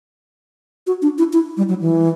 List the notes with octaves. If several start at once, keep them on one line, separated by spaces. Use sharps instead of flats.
F#4
D4
E4
E4
G3
F#3
E3